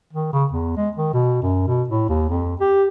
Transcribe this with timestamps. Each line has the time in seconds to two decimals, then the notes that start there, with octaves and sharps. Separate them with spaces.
0.13 D#3
0.33 C#3
0.52 E2
0.77 G#3
0.97 D#3
1.14 B2
1.42 F#2
1.67 B2
1.88 A2
2.09 D#2
2.29 F2
2.60 G4